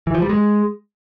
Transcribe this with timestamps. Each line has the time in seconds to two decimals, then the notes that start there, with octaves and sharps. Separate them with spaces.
0.07 E3
0.14 F3
0.22 G3
0.29 G#3